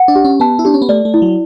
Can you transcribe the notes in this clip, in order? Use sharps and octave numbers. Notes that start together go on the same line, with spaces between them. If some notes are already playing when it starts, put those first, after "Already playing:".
Already playing: F#5
D4
G4
C#4
B3 A5
E4
D4 G4
C#4
B3
A3 D5
A3
E4
F#3